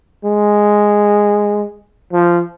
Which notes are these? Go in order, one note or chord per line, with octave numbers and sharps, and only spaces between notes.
G#3
F3